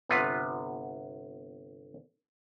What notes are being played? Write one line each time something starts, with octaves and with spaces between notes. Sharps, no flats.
G1 C3 B3 F4 B4